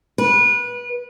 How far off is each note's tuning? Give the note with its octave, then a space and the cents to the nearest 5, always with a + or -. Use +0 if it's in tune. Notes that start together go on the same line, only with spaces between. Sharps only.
B4 -25